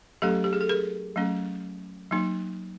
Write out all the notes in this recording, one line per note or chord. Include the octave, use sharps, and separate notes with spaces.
F#3 A3 C#4 G4 A4
G4
G#4
A4
G#4 A#4
F#3 A3 C#4
F#3 A#3 D#4